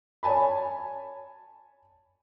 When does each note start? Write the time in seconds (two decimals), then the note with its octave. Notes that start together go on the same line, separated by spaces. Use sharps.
0.23 C#5 G#5 A5 B5